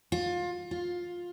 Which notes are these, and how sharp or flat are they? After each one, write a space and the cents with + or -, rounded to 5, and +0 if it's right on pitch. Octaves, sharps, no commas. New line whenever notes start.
F4 +25
F4 +10